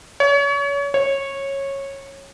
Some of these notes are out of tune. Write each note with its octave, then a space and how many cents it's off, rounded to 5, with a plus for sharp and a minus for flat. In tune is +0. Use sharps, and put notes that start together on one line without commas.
C#5 +30
C#5 -15